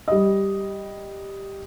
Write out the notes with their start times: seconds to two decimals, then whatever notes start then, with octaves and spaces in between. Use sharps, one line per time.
0.08 G3 D#5